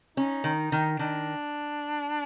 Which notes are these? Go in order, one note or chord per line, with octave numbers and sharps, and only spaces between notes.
C#4 D#4
D#3
D#3
D#3 D4